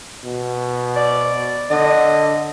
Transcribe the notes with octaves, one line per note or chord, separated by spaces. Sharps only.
B2
D5
D3 D#5